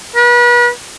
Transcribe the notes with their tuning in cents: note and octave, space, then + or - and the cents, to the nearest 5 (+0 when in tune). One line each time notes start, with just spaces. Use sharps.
B4 -35